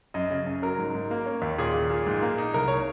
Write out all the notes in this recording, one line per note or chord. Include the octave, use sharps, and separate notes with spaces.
F#2 D#5
C#3
F#2
F#3 A#4
G#2
G#2
A#3
C#4
D#2
A#2 G#4
A#2
A#2
G#2
A#3
D#4
C2 A#4
C#5